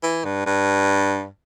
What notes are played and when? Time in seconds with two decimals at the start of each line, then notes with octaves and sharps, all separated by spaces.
0.03 E3
0.25 G2
0.46 G2